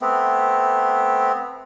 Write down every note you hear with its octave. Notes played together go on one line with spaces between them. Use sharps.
A3 B3 C4